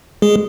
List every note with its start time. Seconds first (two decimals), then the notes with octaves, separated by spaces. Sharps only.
0.22 G#3 G#4